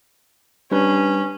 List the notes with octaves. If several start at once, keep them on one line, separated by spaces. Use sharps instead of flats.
G3 C#4 D4 B4